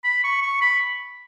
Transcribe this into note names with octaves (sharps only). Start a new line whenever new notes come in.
B5
C#6
C#6
B5